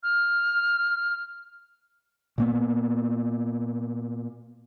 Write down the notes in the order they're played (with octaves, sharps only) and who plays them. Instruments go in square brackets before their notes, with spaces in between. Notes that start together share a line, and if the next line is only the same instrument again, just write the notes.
[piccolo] F6
[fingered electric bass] A#2 A#3 B3